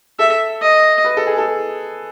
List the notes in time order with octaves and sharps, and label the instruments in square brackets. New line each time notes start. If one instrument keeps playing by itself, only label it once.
[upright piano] A4 [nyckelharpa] E5
[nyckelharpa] D#5
[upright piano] B4
A4
G#4
A4